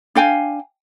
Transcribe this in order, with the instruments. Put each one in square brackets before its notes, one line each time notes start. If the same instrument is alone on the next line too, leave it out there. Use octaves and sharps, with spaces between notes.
[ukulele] D4 F5 G5 G#5